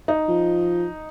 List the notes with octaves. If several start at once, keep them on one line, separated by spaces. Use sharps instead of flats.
D#4
F3